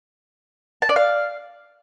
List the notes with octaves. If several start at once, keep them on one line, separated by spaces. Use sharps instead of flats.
A5
D5
F5